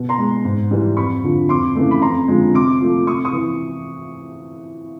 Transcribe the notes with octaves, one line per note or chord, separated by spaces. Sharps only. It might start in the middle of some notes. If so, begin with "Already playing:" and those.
Already playing: B2
A#5 C6
G#3
G#2
E3 G3
F2 B5 C#6
D3 F3
F2 C6 D6
C#3 E3 A3
B5
F2 A#5 C6
D3 F3 G#3
C3 C6 D6
F3 A3
C3 C#6 D#6
C#6 D#6
E3